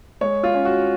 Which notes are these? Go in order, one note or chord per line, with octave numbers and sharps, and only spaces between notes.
G#3 C#5
F4
C#4
F#4